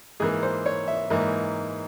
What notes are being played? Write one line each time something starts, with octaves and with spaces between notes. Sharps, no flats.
G#2 E3 A#3 G#4
C5
C#5
E5
G#2 E3 A#3